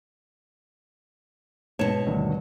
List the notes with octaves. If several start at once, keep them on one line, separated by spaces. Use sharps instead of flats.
G#2 B2 C#5 A5 E7
D2 G2 D#3